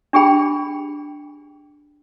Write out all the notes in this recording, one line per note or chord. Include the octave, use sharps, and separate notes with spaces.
D4 G4 G#4 G5 B5